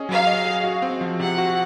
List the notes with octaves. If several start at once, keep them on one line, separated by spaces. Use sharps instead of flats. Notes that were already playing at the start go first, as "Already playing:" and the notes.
Already playing: C#4 G#4 D#5
F#3 F5
D#5
G#4
F#4
C4
F3
C3 F#5
F#4